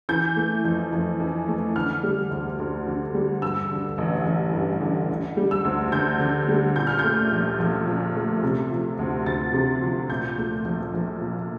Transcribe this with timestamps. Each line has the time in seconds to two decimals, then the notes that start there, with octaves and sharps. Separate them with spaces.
0.09 E3 G6
0.36 A3
0.65 F2
0.92 F2
1.20 E3
1.48 A3
1.76 D3 F6
2.03 G3
2.31 D2
2.59 D2
2.87 D3
3.14 G3
3.42 G2 E6
3.70 D3
3.98 A1
4.26 A1
4.53 G2
4.81 D3
5.10 D3
5.37 G3
5.51 E6
5.65 D2
5.92 D2 G6
6.20 D3
6.48 G3
6.76 A#2 G6
6.87 F6
6.99 A3 G6
7.32 A#1
7.59 A#1
7.87 A#2
8.15 A3
8.43 C3
8.71 F3
8.99 D2
9.26 D2 A6
9.53 C3
9.82 F3
10.09 A#2 G6
10.38 A3
10.65 A#1
10.93 A#1
11.21 A#2